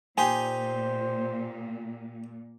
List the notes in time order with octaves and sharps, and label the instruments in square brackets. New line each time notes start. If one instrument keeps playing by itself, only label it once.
[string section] A#2 [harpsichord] D#4 G4 C6 [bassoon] C5 [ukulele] G#5